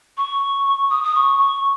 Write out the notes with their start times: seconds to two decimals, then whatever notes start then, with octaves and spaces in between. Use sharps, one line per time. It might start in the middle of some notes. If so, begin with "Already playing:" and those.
0.17 C#6
0.90 D#6
1.03 D#6
1.15 C#6
1.38 C#6